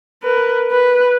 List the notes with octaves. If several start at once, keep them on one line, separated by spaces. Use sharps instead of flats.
A#4 B4
B4